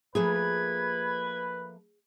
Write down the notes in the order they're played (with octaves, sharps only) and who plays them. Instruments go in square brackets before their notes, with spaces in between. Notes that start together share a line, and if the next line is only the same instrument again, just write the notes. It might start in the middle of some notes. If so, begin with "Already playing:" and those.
[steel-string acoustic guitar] F3 A3 A#3 [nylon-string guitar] G#4 [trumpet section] B4 [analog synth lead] G#6